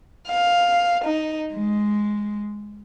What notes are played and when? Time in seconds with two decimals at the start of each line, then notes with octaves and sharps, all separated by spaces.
0.27 F5
1.05 D#4
1.54 G#3